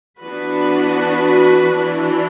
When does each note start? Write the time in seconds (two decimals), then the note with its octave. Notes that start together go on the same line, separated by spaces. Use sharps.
0.19 E3 B3 D4 F#4 B4
1.69 E3 D4